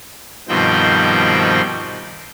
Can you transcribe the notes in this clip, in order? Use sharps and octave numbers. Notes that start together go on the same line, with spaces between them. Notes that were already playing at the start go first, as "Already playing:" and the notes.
G2 B2 D#3 F3 C4 G5